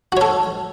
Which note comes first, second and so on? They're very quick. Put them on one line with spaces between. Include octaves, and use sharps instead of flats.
F#4 C#5 A4